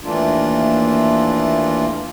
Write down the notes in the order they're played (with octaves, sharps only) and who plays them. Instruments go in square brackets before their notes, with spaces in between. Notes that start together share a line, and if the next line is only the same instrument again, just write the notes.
[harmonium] D#2 E3 A3 A#3 D4 F4